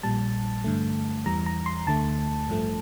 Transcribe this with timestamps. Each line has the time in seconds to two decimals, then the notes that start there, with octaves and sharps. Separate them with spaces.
0.03 A#1 A#2 G3 A5
0.64 G2 D3 A3
1.26 E2 E3 G3 A#5
1.46 A#5
1.66 C6
1.87 D2 D3 A3 A5
2.48 A1 G2 F3 A3